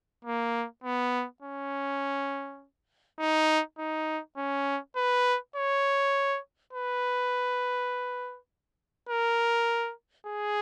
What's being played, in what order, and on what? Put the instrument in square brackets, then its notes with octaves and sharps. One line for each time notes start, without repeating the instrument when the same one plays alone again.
[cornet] A#3
B3
C#4
D#4
D#4
C#4
B4
C#5
B4
A#4
G#4